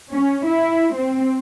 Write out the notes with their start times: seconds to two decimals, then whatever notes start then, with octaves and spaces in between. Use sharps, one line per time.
0.12 C#4
0.47 E4
0.96 C4